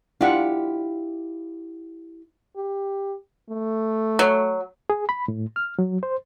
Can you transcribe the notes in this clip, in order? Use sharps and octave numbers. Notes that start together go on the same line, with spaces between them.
D4 E4 F4 G4 F5 F#5
G4
A3
F#3
G#4
B5
A2
F6
F#3
C5